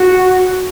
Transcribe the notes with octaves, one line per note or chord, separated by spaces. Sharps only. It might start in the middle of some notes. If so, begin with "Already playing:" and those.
Already playing: F#4